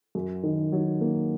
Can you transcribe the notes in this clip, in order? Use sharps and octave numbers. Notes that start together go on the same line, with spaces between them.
F#2
D#3
F#3
A#3